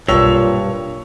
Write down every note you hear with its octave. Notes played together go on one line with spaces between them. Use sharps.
B1 G2 A#2 C#5 E6 F7